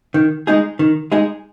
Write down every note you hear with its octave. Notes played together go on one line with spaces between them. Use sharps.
D#3
G#3 D#4 G#4
D#3
G#3 D#4 G#4